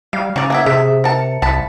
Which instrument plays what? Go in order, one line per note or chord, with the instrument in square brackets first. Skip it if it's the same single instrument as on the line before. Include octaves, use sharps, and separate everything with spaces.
[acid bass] G3 [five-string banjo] F5
[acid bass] C#3 [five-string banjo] C#4 D5 [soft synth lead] A#5
[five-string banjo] A#3 B3 E5 [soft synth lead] G#6
[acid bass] C3 [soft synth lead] G#4 [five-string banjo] E5
[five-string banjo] A#4 A5 [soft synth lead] C#7
[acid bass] C2 [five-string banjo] A5 B5